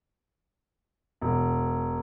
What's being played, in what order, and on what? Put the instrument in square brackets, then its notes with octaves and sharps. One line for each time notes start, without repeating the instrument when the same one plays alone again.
[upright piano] E1